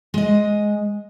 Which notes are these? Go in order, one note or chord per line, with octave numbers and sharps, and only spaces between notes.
G#3 D#5